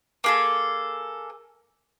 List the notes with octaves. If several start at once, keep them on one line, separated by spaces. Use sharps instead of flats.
A#3 G#4 A4